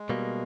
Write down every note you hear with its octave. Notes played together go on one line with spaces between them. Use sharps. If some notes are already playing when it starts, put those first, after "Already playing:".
Already playing: G#3
B2 G3 A#3